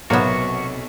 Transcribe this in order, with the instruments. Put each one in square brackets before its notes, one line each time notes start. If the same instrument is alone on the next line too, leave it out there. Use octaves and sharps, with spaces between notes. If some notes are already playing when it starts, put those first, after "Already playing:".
[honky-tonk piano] B1 [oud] C3 C#5 E5 [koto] A#3 B3 [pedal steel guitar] F#4